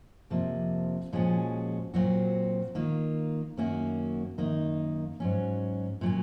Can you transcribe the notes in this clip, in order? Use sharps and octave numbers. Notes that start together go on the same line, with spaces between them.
F2 C3 F3 A#3
A#2 F3 G#3 C#4 F#4
A#2 F#3 C4 F#4
D#3 A#3 F4
F#2 D#3 A#3 C#4 F#4
F#2 D#3 A#3 D#4
G#2 F#3 C#4
A#2 F#3 C#4